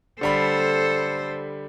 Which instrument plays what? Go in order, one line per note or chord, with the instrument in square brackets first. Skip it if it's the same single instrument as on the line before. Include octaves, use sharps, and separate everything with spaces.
[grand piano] D3 G3 B5 [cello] A4 C5